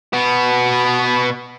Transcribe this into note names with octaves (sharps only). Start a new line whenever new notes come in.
B2 B3